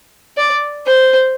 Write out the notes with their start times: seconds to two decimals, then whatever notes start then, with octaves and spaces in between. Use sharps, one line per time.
0.37 D5
0.86 C5